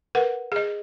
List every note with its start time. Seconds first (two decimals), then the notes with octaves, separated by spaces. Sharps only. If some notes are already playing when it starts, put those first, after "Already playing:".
0.15 A#4 B4 F#5
0.52 G#4 D#5